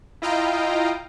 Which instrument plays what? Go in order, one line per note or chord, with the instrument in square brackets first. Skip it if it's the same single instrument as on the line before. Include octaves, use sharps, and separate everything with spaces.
[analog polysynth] E4 F4 D#5 F5 G5 A#5